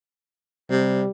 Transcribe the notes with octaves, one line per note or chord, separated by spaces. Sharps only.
C3 G3